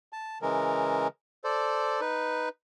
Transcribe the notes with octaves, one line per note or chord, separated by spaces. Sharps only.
A5
C#3 E3 G#3 A#4
A4 C5 D5
D#4 B4